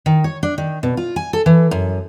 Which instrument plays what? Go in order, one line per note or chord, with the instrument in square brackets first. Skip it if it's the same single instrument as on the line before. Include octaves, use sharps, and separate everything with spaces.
[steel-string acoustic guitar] D#3
C#5
D4
D#3
B2
F4
G#5
A4
E3
F#2